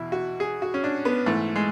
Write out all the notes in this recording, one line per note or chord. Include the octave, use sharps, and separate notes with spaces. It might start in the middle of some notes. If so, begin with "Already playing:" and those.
Already playing: E2 B2 E4
F#4
G#4
F#4
C#4
D4
B3
G#2 E3 A3
G#3